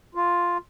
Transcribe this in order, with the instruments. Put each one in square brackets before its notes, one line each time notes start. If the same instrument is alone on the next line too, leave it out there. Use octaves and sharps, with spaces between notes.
[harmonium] F4